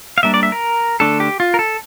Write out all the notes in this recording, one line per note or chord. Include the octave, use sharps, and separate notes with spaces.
F5
G3 A#3 D4 E5
D5
E5
A#4
D3 A3 D4 A4
G4
F4
A#4
A4